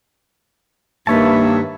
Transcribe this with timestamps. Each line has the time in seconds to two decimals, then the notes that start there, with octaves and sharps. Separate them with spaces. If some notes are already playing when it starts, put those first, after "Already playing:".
1.07 G2 D#3 A#3 B4 C#5 E5 A5